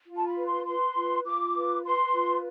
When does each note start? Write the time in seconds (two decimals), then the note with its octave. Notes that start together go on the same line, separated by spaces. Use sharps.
0.07 F4
0.17 A5
0.28 B5
0.37 B4
0.47 C6
0.66 B4 C6
0.96 F4
1.25 F4 D6
1.55 B4
1.84 B4 C6
2.14 F4